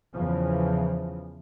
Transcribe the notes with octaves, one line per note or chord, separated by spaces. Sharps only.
E2 C#3 E3 F3